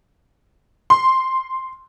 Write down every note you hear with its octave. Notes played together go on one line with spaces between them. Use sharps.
C6